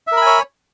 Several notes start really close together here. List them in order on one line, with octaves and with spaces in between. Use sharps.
E5 A#4 B5 G#5 C#5